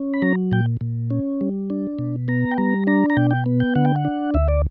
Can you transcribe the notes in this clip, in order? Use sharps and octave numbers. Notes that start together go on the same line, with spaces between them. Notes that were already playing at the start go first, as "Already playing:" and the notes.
Already playing: C#4
B5
F#3 A#5
A#2 G5
A#2
C#4
G3
D4
B2
B3 A#5
G5
G3 A#5
D4 A#5
A#5
B2 G5
G5
B3
G5
D3 F#5
G5
F#5
D4
D2 E5
D5